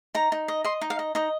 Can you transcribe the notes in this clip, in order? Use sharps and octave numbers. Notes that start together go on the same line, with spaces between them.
D#4 A#5
D#4
D#5
D#5 C6
D#4
F5
D#5
D#4 D#5